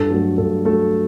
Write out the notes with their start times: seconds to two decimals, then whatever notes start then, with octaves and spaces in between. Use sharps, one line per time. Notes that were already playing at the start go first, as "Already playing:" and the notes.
Already playing: G2 A4
0.11 F#3 A3
0.38 G2 A4
0.65 F#3 A3 A4